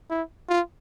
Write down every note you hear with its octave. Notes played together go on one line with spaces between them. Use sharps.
E4
F4